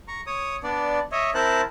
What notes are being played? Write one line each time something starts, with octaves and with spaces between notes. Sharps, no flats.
A#5 C#6
C#5 D#6
B3 D4 D5
C#5 D#5 E5
C4 E4 A#4 C5 A5 F#6